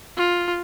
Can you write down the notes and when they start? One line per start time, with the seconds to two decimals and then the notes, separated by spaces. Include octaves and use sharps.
0.17 F4